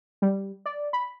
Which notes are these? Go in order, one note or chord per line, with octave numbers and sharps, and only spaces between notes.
G3
D5
B5